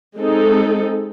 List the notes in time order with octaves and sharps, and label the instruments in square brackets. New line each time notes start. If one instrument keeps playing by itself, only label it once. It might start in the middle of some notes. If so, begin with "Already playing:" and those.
[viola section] G#3 C4 D#4 A4